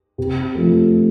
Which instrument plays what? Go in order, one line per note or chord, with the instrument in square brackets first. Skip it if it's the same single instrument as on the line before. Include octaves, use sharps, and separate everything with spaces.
[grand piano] C3
F3 A3